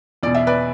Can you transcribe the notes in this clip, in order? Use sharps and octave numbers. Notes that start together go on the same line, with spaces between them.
E2 B2 D5
E5
B4 D5